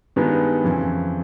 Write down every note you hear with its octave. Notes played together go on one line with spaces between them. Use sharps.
G2 D#3 G#3 B3
F2 C#3 E3